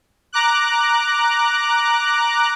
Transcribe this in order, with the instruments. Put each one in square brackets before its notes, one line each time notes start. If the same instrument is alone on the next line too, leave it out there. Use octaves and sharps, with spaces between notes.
[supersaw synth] A#5 D6 F#6